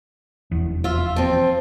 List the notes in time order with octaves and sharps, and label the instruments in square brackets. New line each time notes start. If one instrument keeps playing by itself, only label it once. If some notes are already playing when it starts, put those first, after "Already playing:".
[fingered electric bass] F1 E2
[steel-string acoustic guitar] F4 E5
F3 C4